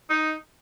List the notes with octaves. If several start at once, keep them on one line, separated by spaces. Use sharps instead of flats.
D#4